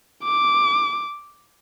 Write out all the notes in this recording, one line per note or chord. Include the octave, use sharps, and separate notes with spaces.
D6